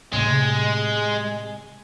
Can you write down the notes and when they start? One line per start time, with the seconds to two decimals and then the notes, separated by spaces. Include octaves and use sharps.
0.13 A2 C3 G#3